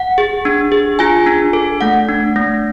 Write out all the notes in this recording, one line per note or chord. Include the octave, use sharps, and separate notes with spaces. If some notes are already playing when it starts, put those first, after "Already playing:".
Already playing: F#5
G#4
D4
G#4
F4 G#5
D4
A4
A3 F#5
D4
A3